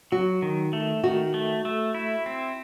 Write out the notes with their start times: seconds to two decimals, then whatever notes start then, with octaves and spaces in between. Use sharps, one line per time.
0.12 F#3 F#4
0.42 D#3
0.73 A3
1.04 D#3 F#4
1.34 A3
1.65 A3
1.94 E4
2.26 C4